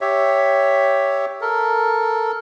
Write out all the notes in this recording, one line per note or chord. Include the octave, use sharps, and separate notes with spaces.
G4 C#5 E5
A4 A#4